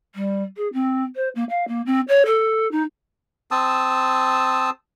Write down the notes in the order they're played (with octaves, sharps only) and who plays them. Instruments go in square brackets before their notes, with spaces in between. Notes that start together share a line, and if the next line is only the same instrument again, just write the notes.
[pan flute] G3
G#4
C4
C5
A#3
F5
A#3
C4
C#5
A4
D#4
[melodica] C4 A5 D#6 E6